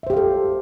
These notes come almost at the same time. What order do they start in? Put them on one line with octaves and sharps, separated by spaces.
E5 C5 G4 F5 A4